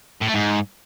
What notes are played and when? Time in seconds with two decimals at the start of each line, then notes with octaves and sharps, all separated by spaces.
0.21 A2
0.28 A3
0.34 G#2